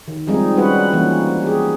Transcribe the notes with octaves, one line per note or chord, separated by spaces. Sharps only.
D#3
F3 G3 G#3 C4 D#4 G#4
G3 C#4 F#4 B4 F#5
E3 F3 A#3 C#4
G4 G#4